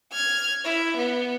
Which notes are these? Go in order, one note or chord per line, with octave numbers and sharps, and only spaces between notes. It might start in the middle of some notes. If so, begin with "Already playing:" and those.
F6 G#6
E4
B3